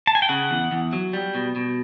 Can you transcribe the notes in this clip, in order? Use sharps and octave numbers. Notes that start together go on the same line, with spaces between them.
A5
G#5
G5
C#3 F#5
E2
E2
F#3
G3
B2
B2